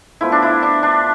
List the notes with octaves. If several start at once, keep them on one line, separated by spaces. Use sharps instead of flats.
A2 F3 B3 E4
D4
E4
D4
D4